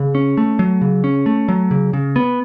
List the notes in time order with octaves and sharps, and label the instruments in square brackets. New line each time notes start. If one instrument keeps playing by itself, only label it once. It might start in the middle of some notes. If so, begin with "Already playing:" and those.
Already playing: [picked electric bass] C#3
C#4
A3
F#3
C#3
C#4
A3
F#3
C#3
C#3
B3